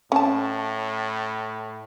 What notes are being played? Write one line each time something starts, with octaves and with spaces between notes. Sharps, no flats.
A2 C#4 A5